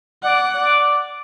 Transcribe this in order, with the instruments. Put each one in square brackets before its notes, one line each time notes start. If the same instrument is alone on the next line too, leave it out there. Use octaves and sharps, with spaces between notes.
[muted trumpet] D5 [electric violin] F#5
[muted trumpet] D5